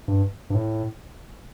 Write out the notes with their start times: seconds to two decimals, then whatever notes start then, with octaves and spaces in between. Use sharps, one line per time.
0.08 G2
0.50 G2
0.55 A2